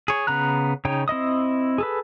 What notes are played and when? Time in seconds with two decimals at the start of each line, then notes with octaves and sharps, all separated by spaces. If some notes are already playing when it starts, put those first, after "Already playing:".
0.08 G#4 C#5
0.27 C#3 B3 A#5 F#6
0.85 C#3 D#4 C#5 G5
1.08 C4 E4 D#5 D#6
1.78 G#4 A4 B4